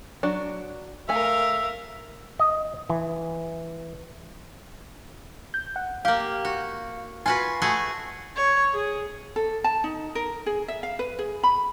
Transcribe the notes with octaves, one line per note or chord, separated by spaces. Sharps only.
F#3 D4 F#4
A3 A#4 E5 F5 G#5
D#5
E3
G6
F#5
A#3 G4 F5
F#4
F4 F#4 B4 G#5 C7
A3 F#4 G#4
C#5
G#4
A4
A5
D#4
A#4
G#4
E5
F5
B4
G#4
B5